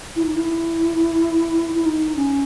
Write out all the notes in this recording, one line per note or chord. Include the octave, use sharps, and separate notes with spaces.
E4
D#4
E4
E4
D#4
C#4